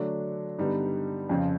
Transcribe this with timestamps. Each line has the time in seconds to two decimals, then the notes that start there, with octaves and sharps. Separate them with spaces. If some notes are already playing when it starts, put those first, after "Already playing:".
Already playing: D3 F#3 A3 D4
0.59 G2 D3 G3 B3 D#4
1.29 F2 C#3 F3